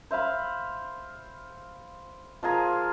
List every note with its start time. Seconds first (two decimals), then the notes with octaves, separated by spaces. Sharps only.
0.11 C5 E5 F5 B5
2.43 F3 F4 G#4 A#4